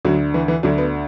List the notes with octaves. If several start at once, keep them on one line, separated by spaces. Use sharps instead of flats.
D2 D3 F#3
E3
E3
D2 D3 F#3
B3